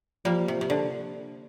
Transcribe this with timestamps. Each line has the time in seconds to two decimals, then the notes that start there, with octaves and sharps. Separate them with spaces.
0.25 F3 G3 A#3
0.48 C3
0.61 C3
0.70 D3